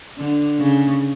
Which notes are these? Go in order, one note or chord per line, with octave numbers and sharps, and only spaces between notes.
D3
C#3